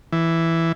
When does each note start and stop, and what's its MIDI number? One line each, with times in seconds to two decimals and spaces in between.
0.12 0.72 52